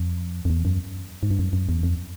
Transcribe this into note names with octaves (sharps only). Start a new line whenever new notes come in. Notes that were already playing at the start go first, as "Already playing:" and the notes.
Already playing: F2
F2
E2
F#2
G#2
G2
F#2
F#2
E2
F2